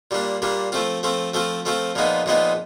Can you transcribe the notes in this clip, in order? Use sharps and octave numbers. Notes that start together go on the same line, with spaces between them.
A#2 G3 A#3 D4
A#2 G3 A#3 D4
F3 A3 C4 F4
F3 A3 C4 F4
F3 A3 C4 F4
F3 A3 C4 F4
A#2 F3 G#3 B3 D#4
A#2 F3 G#3 B3 D#4